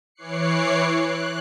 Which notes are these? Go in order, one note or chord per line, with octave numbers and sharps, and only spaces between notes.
E3 C#5 D6 F#6 C7 C#7
F#6